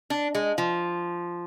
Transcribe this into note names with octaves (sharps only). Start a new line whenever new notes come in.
D4
G#3
F3